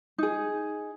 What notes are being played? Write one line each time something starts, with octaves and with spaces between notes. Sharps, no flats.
D#4 G#4